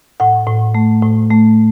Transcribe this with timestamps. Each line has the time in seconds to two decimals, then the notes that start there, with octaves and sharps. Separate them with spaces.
0.20 A2 F#5
0.47 A2
0.75 A3
1.02 A2
1.31 A3